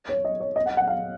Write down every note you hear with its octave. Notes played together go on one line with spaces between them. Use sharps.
C#5
D#5
C#5
D#5
F#5
F#5
F5